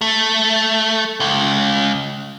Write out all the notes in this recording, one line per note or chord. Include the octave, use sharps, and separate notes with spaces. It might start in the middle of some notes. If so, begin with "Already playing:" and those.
A3
C#2